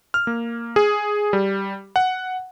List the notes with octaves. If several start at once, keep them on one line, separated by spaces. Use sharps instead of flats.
F6
A#3
G#4
G3
F#5